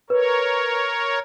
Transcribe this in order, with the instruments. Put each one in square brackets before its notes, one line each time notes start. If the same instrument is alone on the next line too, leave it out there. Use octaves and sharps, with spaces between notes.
[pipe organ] A#4 C#5 [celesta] B4